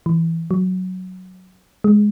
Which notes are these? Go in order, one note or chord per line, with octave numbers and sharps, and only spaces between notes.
E3
F#3
G#3